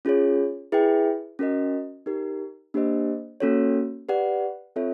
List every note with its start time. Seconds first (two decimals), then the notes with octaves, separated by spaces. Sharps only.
0.05 C#4 F4 G#4 C#5
0.72 E4 G#4 B4 E5 G5
1.39 C#4 F#4 A#4 D#5
2.06 D#4 G4 A#4
2.74 A#3 D4 G4 C5 D#5
3.40 A#3 C#4 F#4 A4 C#5
4.09 G4 B4 D5 F#5
4.76 C4 F4 A4 C#5 E5